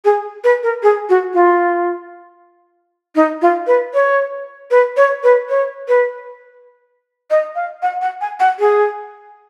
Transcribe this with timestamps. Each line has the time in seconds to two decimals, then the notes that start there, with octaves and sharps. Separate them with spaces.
0.05 G#4
0.44 B4
0.63 A#4
0.83 G#4
1.09 F#4
1.34 F4
3.15 D#4
3.42 F4
3.67 B4
3.94 C#5
4.71 B4
4.97 C#5
5.23 B4
5.49 C#5
5.88 B4
7.30 D#5
7.55 F5
7.82 F#5
8.01 F#5
8.21 G#5
8.40 F#5
8.59 G#4